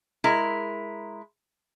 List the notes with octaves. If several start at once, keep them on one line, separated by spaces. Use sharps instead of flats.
G#3 E4 A#4